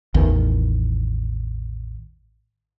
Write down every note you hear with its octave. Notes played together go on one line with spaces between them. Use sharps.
A1 E2 D#3